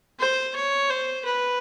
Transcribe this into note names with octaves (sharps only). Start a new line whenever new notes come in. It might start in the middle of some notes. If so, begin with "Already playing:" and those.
C5
C#5
C5
B4